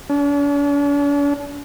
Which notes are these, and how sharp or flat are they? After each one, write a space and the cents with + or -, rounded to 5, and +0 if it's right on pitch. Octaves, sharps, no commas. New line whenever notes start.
D4 -45